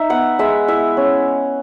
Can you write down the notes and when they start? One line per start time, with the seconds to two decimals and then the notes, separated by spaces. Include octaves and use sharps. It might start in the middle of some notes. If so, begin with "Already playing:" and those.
Already playing: D#4 E5
0.10 B3 F#5
0.39 G#3 E5
0.68 E4 E5
0.97 C#4